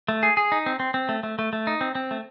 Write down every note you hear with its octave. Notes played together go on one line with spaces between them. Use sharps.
A3
G#4
G#4
D#4
C4
C4
C4
A3
A3
A3
A3
D#4
C4
C4
A3